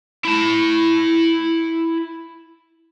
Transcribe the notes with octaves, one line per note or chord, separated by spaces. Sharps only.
E4 A5